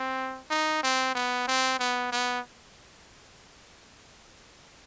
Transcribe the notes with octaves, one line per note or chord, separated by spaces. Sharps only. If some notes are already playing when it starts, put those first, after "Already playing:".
Already playing: C4
D#4
C4
B3
C4
B3
B3